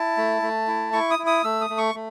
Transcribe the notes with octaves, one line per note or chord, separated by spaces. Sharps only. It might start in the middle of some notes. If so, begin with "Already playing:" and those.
Already playing: E4 A5
A3
A3
E4
E4 C#6
D#6
E4
D#6
A3 E6
D#6
A3
C#6
A3